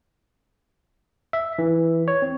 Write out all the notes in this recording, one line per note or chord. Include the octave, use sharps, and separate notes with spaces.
E5
E3
C#5
C4